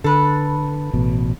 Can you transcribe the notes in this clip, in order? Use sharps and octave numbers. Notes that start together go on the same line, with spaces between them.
D3 A4 B4
A1 B2